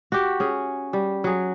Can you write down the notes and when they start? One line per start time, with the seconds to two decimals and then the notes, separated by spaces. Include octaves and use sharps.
0.12 F#4 G4
0.40 C#4 G#4
0.93 G3
1.24 F#3 G#4